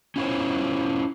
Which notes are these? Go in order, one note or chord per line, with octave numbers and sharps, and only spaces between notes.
C#4 E4 F4 G4 C5 C#5